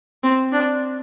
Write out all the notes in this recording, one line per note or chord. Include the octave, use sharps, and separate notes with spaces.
C4
D4